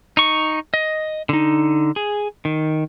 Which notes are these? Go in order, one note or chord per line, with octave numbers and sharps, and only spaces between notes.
D#4 C#6
D#5
D3 D#4
G#4
D#3